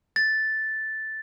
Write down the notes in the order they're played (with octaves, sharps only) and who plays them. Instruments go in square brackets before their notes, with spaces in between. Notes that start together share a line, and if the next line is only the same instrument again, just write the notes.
[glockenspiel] A6